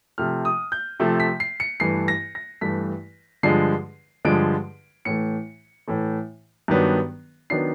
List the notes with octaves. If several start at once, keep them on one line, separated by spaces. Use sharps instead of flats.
C3 F3 A3 F6
D#6
G6
C3 F3 A3
B6
C7
C#7
G2 E3 A3 C7
A#6
A#6
G2 E3 A3 B6
G2 D3 F3 G#3 C7
G2 D3 F3 G#3 D7
A2 E3 A3 C#7
A2 E3 A3
G2 D#3 F#3 B3 D4
D#3 F#3 B3 D4 C7